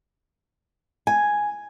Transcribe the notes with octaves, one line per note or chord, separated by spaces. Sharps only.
G#5